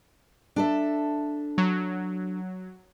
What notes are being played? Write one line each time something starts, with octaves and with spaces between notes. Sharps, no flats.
D4 A4 E5
F#3